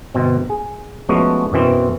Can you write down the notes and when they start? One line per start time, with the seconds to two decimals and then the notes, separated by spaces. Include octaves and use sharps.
0.15 G1 B2 C4
0.50 G#4
1.09 F3 G#3 A3 B3 C#4 F#4
1.52 F#2 B2 E3 C4